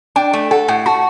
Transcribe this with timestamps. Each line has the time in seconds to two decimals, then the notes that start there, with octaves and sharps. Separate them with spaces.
0.16 D4 G5
0.33 A3
0.51 A4 F#5
0.68 A2 F#5
0.86 F#4 A5